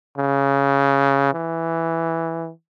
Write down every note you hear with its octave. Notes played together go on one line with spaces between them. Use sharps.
C#3
E3